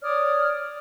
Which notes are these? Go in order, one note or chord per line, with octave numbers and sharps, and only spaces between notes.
C#5 D5 D#6 F6